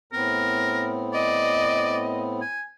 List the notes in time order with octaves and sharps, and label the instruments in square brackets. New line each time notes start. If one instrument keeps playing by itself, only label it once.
[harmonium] A2 B3 C4 [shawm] A#4
[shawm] D5 [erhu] D#5
[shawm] G#5